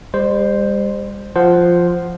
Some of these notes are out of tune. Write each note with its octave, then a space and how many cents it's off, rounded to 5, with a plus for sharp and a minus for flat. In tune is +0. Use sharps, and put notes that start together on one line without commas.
G3 +40 C5 +0
F3 +0 C5 +0 F#5 +5